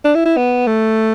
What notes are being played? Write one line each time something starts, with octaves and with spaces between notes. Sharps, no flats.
D4
E4
E4
B3
A3